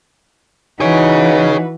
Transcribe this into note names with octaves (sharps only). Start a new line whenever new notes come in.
E3 D#4 F#4 G#4 B4 C#5